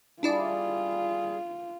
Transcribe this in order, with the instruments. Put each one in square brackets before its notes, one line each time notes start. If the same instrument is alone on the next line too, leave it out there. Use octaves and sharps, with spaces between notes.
[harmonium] G3 G#4 [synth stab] D4 E4 D5 [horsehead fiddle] F4